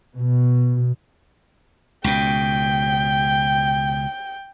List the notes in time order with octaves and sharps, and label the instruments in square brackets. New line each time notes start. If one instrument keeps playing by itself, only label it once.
[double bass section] B2
[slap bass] C#2 B2 [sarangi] G5